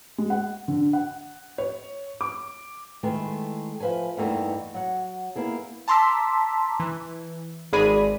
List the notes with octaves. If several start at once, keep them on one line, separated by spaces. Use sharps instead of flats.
G#3
F#5
D3
F#5
C#5
D6
D#3 G#3 A3 E4 A4 B4
F3 B4 E5 G#5
E2 G2 E3 A3 A#3 D#4
F#3 F#5
A#3 B3 E4 G#4
A5 A#5 C6 D6 E6 B6
E3
G#1 G#3 G#4 D5 B5 D#7